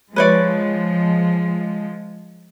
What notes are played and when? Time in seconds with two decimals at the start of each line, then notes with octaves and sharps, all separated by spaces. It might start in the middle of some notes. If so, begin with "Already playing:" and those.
0.16 F3 G#3 B4 C#5 D5